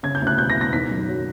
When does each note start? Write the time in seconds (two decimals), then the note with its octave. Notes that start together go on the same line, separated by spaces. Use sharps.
0.03 C#3 G#6
0.15 G6
0.22 D2
0.27 F#6
0.38 E1 G6
0.50 A#6
0.56 E1
0.61 A#6
0.73 D#3 B6
0.91 F#2
1.08 F#3